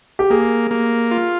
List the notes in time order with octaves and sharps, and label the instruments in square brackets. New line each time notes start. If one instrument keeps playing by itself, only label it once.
[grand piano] G4
[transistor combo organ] A#3 [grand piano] G#4
[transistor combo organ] A#3
F4